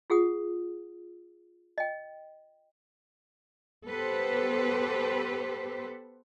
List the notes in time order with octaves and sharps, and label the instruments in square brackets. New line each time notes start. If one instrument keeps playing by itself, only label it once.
[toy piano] F4 G#4 F#5 D#6
D#5 G5
[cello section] B3 G4 A4 B4 C5